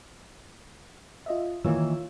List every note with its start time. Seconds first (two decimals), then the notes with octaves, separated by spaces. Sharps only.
1.26 F4 D#5 E5
1.64 D#3 E3 A#3 F4 C#5 E6